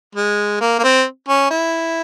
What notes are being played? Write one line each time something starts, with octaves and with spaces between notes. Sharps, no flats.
G#3
A#3
A#3
C4
C#4
E4